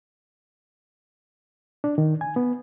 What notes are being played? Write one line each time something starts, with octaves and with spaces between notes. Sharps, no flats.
D4
D#3
G#5
B3